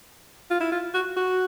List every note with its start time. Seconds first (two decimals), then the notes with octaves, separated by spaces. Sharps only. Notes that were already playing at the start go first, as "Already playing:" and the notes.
0.51 F4
0.61 E4
0.72 F4
0.94 F#4
1.17 F#4